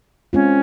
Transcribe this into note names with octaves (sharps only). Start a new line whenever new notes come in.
G#3 C4 C#4 F4